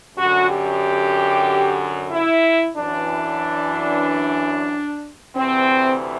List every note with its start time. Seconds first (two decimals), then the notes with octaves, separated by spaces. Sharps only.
0.17 F#2 D3 F#4
0.49 G4
2.12 E4
2.77 F#2 E3 D4
5.36 D2 C3 E3 C4